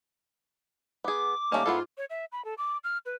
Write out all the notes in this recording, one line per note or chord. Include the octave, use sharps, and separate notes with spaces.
B3 G#4 D6
D#3 G3 A3 A#3 C#4 D#5
G#2 B3 E4 F4 A4
C#5
E5
B5
A4
D6
F6
B4